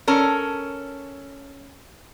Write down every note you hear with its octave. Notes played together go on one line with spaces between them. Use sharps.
C#4 A4 A#4